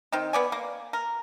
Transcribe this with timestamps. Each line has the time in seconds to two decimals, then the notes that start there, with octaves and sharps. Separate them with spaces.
0.12 D#3 C4 D#4
0.33 B3 D5 G#5
0.52 A#3
0.93 A#4